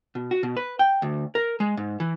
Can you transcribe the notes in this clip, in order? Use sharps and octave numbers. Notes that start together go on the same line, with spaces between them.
B2
F#4
B2
B4
G5
D2
A#4
G#3
G#2
E3